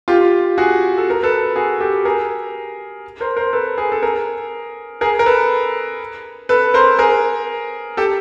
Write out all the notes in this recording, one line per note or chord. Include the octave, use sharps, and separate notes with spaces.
F4 G4
F#4 G#4
A4
A#4
A4 B4
F#4 G#4
G4 A4
G#4 A#4
A#4 C5
A#4 C5
A4 B4
G#4 A#4
A4
G#4 A#4
G#4 A#4
A#4
A4 B4
A4 B4
A#4 C5
G#4 A#4
G4 A4